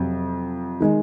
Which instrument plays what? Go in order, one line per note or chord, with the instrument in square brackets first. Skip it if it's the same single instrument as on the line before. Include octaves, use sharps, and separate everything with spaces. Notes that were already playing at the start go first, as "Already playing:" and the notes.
Already playing: [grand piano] F2 C3 F#3
D#3 G#3